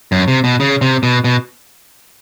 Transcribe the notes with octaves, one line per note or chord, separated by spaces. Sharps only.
F#2
C3
B2
C#3
C3
B2
B2